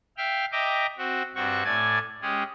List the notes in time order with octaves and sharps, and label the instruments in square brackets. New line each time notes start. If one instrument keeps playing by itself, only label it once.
[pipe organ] E5 F5 G5 F6
D#5 E5 G5 A#5 D6
C4 F#4
G2 C4 F#4 C#6
A2 A3 D5 G#5 G#6
G#3 C#4 G4 G#4